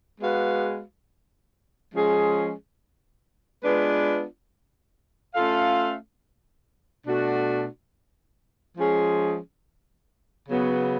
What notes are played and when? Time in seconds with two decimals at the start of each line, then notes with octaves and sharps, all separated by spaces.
0.21 G#3 B3 F#4 B4 F5
1.93 F3 G#3 C#4 G#4
3.63 G#3 B3 D4 F4 B4
5.35 A3 C#4 F4 A4 F5
7.06 B2 A3 D4 F#4
8.78 F3 G#3 C#4 G#4
10.48 C#3 F#3 B3